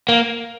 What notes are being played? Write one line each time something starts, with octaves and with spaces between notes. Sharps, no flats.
A#3